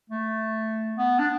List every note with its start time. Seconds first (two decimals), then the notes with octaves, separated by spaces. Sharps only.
0.10 A3
0.97 B3
1.19 D4